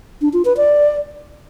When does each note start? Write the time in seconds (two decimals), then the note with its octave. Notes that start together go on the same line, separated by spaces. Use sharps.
0.21 D4
0.33 F4
0.45 B4
0.57 D5